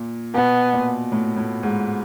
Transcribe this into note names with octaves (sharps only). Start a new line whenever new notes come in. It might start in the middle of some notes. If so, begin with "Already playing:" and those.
Already playing: A#2
B2 B3
A#2
A2
A2
G#2